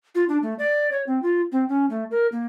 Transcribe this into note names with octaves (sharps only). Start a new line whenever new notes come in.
F4
D4
A3
D5
C#5
C4
F4
C4
C#4
A3
A#4
A#3